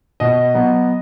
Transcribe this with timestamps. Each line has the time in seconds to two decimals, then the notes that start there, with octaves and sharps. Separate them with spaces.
0.20 B2 D#5
0.54 F#3 B3